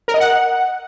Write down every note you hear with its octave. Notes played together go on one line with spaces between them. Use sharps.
A#4
D#5
F#5